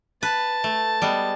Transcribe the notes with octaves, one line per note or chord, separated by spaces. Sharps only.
B4 A5
A3
G3 G#3 B3